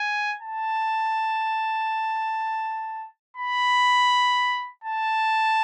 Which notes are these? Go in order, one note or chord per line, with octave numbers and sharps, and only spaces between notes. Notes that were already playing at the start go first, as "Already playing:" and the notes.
Already playing: G#5
A5
B5
A5